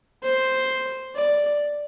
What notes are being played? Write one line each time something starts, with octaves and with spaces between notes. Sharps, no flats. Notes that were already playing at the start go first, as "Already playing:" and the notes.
C5
D5